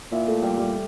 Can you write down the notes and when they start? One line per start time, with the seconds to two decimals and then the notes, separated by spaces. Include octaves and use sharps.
0.12 A#2 E4 E5
0.27 A3 A4
0.42 G3 G4
0.58 G3 G4